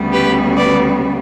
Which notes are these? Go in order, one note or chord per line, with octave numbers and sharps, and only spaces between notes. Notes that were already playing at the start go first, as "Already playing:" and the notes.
Already playing: D2 C#3 G3 B3
G4 B4
B4 D5